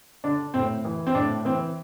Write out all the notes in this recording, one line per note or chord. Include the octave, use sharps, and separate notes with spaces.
D3 D4
A2 C4
E3
C4
A2 D4
E3 C4